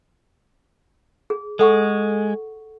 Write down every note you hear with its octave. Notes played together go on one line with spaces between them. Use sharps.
G#4
G#3 A4 F#5 C#6